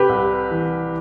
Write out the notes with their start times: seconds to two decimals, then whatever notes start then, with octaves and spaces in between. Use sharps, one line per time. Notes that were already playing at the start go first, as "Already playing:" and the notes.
Already playing: C3 G4 B4
0.09 C2
0.51 E3